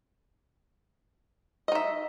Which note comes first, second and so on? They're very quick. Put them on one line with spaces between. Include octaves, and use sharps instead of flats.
D#5 D#4 E5